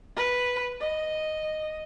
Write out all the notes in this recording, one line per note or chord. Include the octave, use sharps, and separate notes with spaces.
B4
D#5